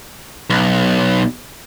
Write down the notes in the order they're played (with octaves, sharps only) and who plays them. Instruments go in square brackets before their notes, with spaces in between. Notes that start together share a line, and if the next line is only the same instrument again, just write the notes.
[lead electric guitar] B1